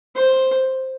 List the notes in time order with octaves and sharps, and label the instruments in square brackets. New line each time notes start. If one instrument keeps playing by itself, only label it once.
[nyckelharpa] C5